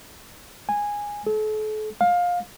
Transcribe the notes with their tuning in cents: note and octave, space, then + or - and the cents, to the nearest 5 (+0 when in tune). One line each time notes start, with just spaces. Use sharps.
G#5 -10
A4 -40
F5 +20